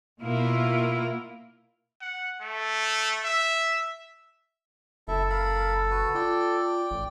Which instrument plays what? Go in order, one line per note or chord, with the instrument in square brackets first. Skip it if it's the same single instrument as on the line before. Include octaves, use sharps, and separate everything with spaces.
[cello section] B2 A#3 E4 F4 A#4
[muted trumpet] F#5
A3
E5
[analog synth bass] F#1 [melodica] E4 E5 [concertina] A4
[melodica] A#4 F5 B5
F#4 B4
[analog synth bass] F4 [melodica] D5 G5
[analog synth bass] A1